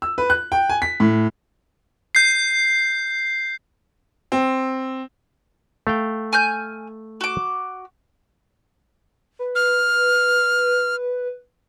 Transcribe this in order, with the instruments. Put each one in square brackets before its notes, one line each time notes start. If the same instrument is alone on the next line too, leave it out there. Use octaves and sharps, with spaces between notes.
[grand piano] E6
B4
F#6
G5
G#5
B6
A2
[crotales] G6 C7
[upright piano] C4
[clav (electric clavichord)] A3 F5 G5
[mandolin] G#5 F6 G6
F#4 D6
[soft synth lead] B4
[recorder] F6